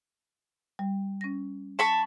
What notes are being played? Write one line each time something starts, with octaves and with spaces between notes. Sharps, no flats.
G3
C#4 A#6
A5 B5 C#6